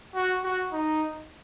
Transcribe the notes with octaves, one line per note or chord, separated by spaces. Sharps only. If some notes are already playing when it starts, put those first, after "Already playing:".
F#4
F#4
D#4